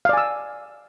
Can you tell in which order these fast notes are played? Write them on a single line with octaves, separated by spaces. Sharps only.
F5 D5 G#5 E6